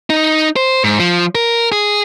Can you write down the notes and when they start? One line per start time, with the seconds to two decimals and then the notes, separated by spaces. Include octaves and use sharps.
0.10 D#4
0.56 C5
0.84 G#2
1.00 F3
1.35 A#4
1.72 G#4